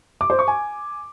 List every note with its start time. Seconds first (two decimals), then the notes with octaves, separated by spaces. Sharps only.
0.21 D6
0.30 C5
0.39 C#6
0.48 G#5